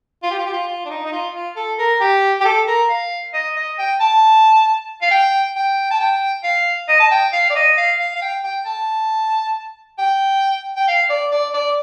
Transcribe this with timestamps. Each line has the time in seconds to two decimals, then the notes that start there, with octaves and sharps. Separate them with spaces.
0.23 F4
0.31 G4
0.38 F4
0.46 G4
0.53 F4
0.68 F4
0.85 D4
0.90 D#4
1.05 D#4
1.12 F4
1.35 F4
1.56 A4
1.78 A#4
2.00 G4
2.41 G4
2.45 A4
2.67 A#4
2.89 F5
3.34 D#5
3.56 D#5
3.78 G5
4.00 A5
5.02 F5
5.11 G5
5.56 G5
5.91 A5
6.00 G5
6.44 F5
6.88 D#5
7.00 A5
7.11 G5
7.33 F5
7.50 D5
7.55 D#5
7.77 F5
7.99 F5
8.16 F5
8.22 G5
8.44 G5
8.66 A5
9.98 G5
10.76 G5
10.88 F5
11.10 D5
11.32 D5
11.54 D5